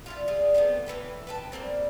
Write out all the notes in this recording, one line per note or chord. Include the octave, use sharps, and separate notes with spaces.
G3 E4 F4
G3 F4 G#4
A3 B3 C4 G4
A2 E3 B4 G5
B4 G5 A5
G3 G#3 A#3 C4